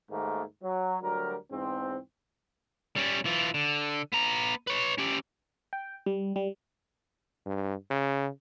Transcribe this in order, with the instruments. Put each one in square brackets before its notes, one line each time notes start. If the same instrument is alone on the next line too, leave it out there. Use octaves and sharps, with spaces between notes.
[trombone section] D#2 G#2 D#3 A3 A#3
F#3
D2 F#3 G3 A#4
E2 G#2 C4
[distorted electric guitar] G3 C#4
E3 F4
D3
B3 A#5
B4 C#5
C#4 G4
[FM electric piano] G5
G3
G3
[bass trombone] G2
C#3